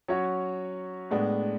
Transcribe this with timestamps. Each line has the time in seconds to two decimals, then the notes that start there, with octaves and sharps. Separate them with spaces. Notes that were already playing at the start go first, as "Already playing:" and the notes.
0.08 F#3 C#4 F#4 C#5
1.11 A2 G#3 B3 D4